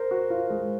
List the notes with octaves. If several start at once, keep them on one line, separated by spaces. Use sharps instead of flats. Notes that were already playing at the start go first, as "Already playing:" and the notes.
Already playing: A#4 C5
F#4
F4
G#3